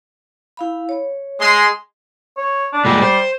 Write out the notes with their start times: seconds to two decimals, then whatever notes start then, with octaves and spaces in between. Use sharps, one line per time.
0.57 E4 F5 B5
0.89 C#5
1.40 G#3 C6
2.38 C#5
2.73 D4
2.85 A#2 G3 G#3
3.02 C5